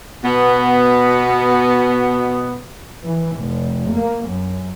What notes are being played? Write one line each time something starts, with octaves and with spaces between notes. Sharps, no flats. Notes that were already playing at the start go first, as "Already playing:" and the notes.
B2 B3
E3
F1
A#3
F#2